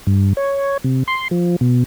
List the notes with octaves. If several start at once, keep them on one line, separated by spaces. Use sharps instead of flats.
G2
C#5
C3
C6
F3
B2